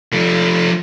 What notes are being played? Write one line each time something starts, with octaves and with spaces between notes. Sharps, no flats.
F3 A3